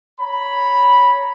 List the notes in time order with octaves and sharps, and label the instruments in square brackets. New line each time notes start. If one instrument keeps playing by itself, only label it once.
[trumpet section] C#5 A#5 B5